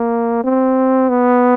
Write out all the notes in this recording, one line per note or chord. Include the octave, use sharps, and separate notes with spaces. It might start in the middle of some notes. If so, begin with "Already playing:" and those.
Already playing: A#3
C4
B3